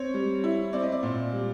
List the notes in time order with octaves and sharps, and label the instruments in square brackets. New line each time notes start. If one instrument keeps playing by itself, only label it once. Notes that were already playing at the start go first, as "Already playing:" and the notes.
Already playing: [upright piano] C4 C#5
G3
E4
C4 D5
D#5
D5
A#2
G3